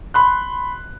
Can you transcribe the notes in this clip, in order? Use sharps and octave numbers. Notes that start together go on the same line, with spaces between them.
B5 C6 F#6